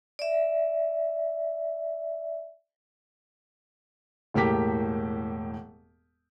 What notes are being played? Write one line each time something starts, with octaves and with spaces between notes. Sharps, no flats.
D5 E5
E1 A2 A#3 G4 B6